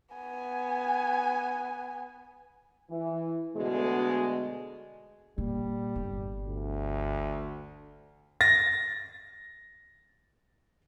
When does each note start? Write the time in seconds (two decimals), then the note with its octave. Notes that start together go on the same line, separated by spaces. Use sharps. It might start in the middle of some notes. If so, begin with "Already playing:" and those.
0.15 B3 G#5
2.90 E3
3.56 D2 B2 G#3
5.38 A#2 G3
5.96 G1
6.47 D2
8.41 A6 A#6